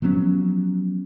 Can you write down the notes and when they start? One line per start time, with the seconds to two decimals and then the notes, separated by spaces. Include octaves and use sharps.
0.02 F3 F#3 B3 C#4